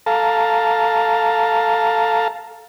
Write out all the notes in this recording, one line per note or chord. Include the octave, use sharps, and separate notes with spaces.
A4 F5 A5 A#5